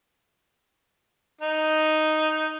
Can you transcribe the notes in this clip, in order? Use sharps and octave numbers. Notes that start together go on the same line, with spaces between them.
D#4